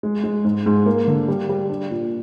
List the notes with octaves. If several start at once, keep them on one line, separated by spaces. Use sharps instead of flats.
G#3
G#3
G#2
G#2
A#3
D3
G3
G3
D4
A#2